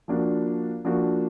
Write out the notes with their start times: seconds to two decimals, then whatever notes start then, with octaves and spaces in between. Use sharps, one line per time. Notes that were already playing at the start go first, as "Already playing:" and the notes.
0.08 F3 A#3 D4 F#4
0.85 F3 A#3 D4 F#4